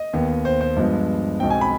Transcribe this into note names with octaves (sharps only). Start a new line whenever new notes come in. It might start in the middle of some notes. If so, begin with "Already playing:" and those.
Already playing: D#5
D#2 D#3 B3
C5
C5
G2 F3 G#3 B3
B1 B2 G#3 C4 G5
G#5
B5